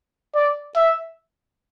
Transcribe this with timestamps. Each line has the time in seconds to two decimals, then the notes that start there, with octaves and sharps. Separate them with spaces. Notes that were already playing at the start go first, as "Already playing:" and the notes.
0.35 D5
0.76 E5